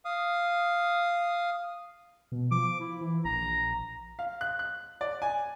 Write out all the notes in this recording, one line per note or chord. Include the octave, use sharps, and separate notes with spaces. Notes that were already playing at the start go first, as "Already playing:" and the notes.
F5 D#6
B2
F3 D6
E4
E3
A#1 A#5
F5
F#6
F#6
D5
G#5